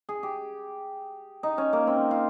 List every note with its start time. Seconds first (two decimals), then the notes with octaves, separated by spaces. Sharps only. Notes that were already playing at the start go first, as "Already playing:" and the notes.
0.09 G#4
0.23 G4
1.43 D#4
1.58 C#4
1.73 A#3
1.87 C4
2.11 F4